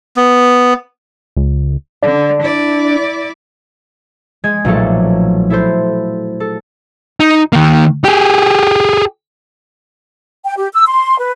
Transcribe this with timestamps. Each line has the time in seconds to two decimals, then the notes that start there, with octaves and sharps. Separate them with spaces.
0.17 B3
1.36 C#2
2.02 D3 D4
2.42 E4 D5
4.44 G#3 G#6
4.65 B1 A#2 F3 F#3 A3 A4
5.50 E4 A4 C5
6.40 A4
7.20 D#4
7.53 D#3 A#3
8.05 G4 G#4
10.45 G5
10.57 G4
10.74 E6
10.87 C6
11.19 B4